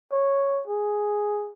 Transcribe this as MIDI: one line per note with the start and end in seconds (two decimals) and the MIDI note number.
0.12 0.62 73
0.67 1.51 68